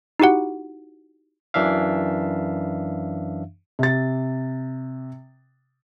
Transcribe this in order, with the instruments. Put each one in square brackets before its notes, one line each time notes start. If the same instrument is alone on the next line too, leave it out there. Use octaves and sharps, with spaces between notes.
[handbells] D#4 E4 F#4 G4 F#5
[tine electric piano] F#2 E3 D4 E5 F5
[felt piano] C3 A6